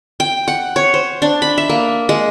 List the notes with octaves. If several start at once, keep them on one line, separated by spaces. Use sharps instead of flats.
G5
F#5
C#5
C5
D4
B5
E5
A#3
G#3